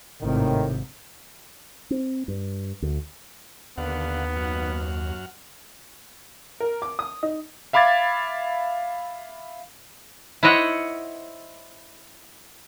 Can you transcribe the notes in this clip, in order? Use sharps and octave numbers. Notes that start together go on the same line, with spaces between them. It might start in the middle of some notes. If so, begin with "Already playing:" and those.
G#1 A2 C3 D#3
C4
G2
D2
D#2 D3 B3 F5 F#5
F#2 F#5 F6
A#4
D6
D#6
D#4
E5 F5 B5 D6 G#6 A6
E4 C5 C#5 D#5 F#5